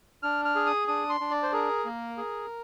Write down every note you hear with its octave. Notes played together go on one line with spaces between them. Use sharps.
D4 F6
F6
G#4
D#6
D4 D#6
C6
D4
D5
C5
G#4 A#4
A#3
G#4